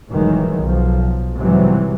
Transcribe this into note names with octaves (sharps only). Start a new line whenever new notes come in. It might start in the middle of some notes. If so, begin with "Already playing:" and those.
F1 A2 D#3 E3 F#3 G#3
B1 F3
G#2 C3 E3 F#3 G3